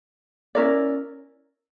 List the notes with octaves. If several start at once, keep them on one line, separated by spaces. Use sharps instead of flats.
C#4 E4 A#4 D5